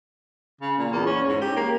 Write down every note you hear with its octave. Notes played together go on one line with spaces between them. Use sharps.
C#3
A#2
E2
C#4
G#2
G4
A#3